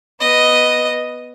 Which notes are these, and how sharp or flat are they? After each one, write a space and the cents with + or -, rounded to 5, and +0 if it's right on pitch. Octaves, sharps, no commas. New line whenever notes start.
B3 +0 D#5 +0